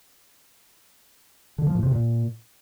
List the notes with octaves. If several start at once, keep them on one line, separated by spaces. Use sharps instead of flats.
D3
F3
A2
C3
A#2